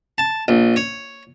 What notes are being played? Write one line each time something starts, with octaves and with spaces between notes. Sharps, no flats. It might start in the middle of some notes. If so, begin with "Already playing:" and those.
A5
A#1
C#5